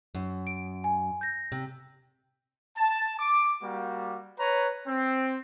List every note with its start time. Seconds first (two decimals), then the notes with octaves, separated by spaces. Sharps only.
0.15 F#2
0.47 D7
0.84 G#5
1.21 G6 A#6
1.52 C3
2.77 A5
3.18 D6
3.63 G3 A#3 F#4
4.39 B4 C#5 A#5
4.87 C4